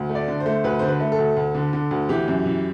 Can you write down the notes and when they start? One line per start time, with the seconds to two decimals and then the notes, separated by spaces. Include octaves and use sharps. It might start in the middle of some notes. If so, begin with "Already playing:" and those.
Already playing: D2
0.09 A3
0.15 D5
0.28 D3
0.40 C5
0.46 A3
0.64 D2 B4
0.79 D3 C5
0.88 B4
1.00 A3
1.12 A4
1.19 D2
1.36 D2
1.55 D3
1.73 D3
1.91 D2
2.09 E3 G4
2.28 F#2
2.45 E3